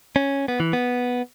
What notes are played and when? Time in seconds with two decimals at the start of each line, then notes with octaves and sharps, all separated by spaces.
0.16 C#4
0.48 B3
0.60 E3
0.73 B3